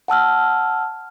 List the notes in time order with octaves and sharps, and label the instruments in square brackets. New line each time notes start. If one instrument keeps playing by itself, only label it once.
[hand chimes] F#5 A5 E6 F6